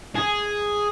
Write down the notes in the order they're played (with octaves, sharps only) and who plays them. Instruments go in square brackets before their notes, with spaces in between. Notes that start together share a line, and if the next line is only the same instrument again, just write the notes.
[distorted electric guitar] G#4